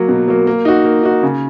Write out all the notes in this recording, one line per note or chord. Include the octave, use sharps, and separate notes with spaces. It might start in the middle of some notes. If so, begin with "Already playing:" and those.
Already playing: F#3 A#3
B2
F#3 A#3
A#3
D#4 F#4
A#3
D#4 F#4
C#3